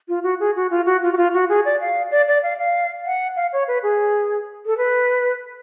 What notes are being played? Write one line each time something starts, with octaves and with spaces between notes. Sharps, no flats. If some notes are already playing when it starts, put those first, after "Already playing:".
F4
F#4
G#4
F#4
F4
F#4
F4
F#4
F4
F#4
G#4
D5
F5
D5
D5
F5
F5
F#5
F5
C#5
B4
G#4
A4
B4